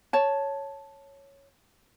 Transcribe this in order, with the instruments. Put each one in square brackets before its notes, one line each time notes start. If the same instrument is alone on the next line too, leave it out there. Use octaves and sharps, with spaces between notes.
[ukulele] C#5 A5